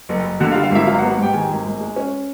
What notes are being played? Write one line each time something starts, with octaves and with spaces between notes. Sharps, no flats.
F#1
F#1
D3 F#4 F#5
F4 F5
G3
F4 F5
G#1 E4 E5
F#3 F4 F5
F#4 F#5
B3
F#4 F#5
G#2 G4 G5
D#3 G#4 G#5
G#1
G#1
G#3
C#4